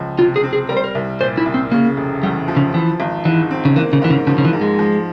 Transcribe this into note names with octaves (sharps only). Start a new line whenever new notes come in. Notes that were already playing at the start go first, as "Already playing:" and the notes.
Already playing: C#2 F3
C3 F4
G#4
C4
G#4
G3 A#4
C5
A#4
C2
A#2 C5
E4
C2
C4
C#3 A#3
F1
E2 G3
F3
C#3
E3 F3
G#1
G#2 E3
C4
C#3
E3 A#3
C#3
G#2 E3
C#3
C#3 F3
C#3
E3
G#2
G#3
F3